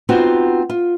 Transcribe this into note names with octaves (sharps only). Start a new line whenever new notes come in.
B3 C4 D#4 F4 F#4
F4